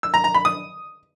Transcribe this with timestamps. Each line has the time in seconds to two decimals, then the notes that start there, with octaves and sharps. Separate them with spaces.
0.03 E6
0.14 A#5
0.24 A#5
0.35 B5
0.45 D#6